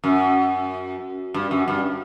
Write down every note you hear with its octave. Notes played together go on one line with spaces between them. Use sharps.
F#2
G2
F#2
G2